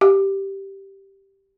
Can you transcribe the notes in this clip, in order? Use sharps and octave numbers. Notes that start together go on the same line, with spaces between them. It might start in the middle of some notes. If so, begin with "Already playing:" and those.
G4